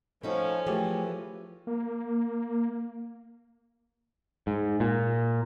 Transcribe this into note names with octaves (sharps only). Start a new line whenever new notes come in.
F3 A3 C#4 D#4 F#4
E3 F3 A3 G4 G#4
A#3
G#2
A#2